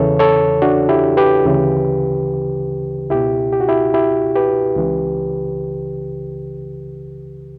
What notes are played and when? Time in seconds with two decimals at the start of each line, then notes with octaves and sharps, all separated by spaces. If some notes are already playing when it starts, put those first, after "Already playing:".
Already playing: E2 C#3 E3 A4 C#5
0.19 A4 C#5
0.62 D4 F#4
0.89 E4 G4
1.17 G4 B4
1.45 D2 C#3 E3
3.10 C#2 B2 E4 G4
3.53 G4
3.61 F#4
3.69 E4 G4
3.94 E4 G4
4.36 G4 B4
4.77 C#2 C#3 E3